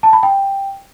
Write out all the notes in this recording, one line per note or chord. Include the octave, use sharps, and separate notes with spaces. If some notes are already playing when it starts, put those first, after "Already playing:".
A5
B5
G5